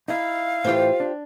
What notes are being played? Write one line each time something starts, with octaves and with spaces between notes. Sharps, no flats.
D#4 E4 F5
A2 E3 F4 G4 C5
D4